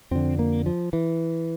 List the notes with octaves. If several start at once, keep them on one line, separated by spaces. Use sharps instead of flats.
F2 D3 C4
A#3
F3
E3